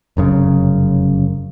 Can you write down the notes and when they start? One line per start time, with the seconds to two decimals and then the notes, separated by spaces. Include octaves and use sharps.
0.17 F1 F#2 C#3